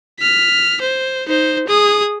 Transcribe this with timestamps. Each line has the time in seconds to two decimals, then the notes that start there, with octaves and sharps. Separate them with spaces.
0.20 F6 B6
0.81 C5
1.28 D#4 C5
1.67 G#4 D#6